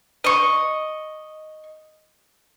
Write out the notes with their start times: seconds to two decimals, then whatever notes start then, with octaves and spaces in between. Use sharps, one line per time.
0.24 D#5 C#6